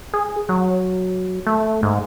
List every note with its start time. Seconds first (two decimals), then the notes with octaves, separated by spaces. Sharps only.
0.14 G#4
0.49 F#3
1.47 A3
1.83 G#2